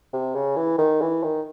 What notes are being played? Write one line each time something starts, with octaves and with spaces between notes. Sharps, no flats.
C3
C#3
E3
D#3
E3
D#3